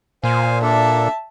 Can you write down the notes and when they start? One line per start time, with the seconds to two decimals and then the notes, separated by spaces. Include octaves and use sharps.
0.24 A#2 C5 F5 G#5
0.62 A#3 D4 A4 E5 A5